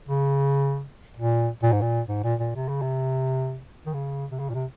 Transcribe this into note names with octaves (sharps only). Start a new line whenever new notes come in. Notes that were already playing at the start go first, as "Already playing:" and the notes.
C#3
A#2
A#2
G#2
A#2
G#2
A#2
A#2
C3
C#3
C3
D#3
C#3
C3
C#3
A#2
C3